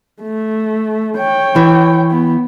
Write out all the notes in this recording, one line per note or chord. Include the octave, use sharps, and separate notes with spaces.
A3
C#5 G5
E3
B3